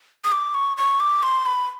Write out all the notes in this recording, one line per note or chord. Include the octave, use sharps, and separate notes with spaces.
D#6
D6
C#6
C#6
D6
C6
B5